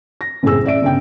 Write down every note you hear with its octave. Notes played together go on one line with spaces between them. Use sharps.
A#6
F#1 A2 C4 G#4 E6
A1 D5 E5 D7
G1 C#3 G5